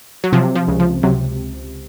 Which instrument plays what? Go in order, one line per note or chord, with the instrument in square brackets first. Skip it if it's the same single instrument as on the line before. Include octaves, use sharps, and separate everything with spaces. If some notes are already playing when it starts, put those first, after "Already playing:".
[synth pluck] F#3
[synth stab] C3 [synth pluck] F3
[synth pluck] F3
[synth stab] C#2
[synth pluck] F3
[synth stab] C3 [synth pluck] F#3